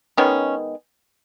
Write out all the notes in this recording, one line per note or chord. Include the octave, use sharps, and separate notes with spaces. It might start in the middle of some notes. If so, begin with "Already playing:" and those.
D#3 G#3 B3 C#4